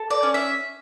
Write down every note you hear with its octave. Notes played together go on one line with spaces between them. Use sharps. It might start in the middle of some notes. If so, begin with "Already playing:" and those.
Already playing: A4
D5
C#4
E5